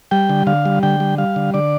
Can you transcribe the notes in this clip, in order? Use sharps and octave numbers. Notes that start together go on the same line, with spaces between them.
G3 G5
D3
D3 F5
G3
D3 G5
G3
G3 F5
D3
D3 D5